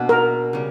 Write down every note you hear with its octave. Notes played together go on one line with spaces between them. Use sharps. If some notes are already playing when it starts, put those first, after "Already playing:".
Already playing: B2 A#3 D4
A#4
C#3 G3